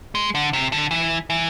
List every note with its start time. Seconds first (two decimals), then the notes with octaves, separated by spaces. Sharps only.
0.15 G#3
0.35 D3
0.53 C3
0.72 D3
0.91 E3
1.30 E3